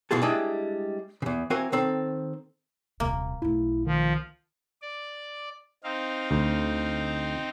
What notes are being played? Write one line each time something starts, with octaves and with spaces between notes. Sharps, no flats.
B2 E3 F4 G#4 A4
G3 G#3 D4 E4 D#5
E2 C#3
E3 C4 F#4 A#4 F5 G#5
D#3 C4 A4
D#1 C3 A#3
B1 A3 E4
D#3 F3
D5
C4 D#4 F5
D2